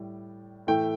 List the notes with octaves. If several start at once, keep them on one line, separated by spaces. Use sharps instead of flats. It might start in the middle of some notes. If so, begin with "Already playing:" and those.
Already playing: A2 G3
A2 E3 A3 G5